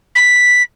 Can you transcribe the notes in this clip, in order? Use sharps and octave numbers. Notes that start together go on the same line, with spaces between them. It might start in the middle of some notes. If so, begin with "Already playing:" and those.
B6